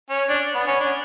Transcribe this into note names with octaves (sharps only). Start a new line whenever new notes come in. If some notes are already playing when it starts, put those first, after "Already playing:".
C#4
D4
B3
C#4
D4